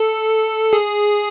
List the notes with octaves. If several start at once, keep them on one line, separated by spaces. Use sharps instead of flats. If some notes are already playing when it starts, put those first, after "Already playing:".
Already playing: A4
G#4